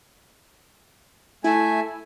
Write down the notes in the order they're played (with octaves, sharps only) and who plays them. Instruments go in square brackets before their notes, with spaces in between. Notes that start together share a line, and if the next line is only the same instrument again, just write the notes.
[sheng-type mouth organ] A3 E5 G#5 [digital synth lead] E4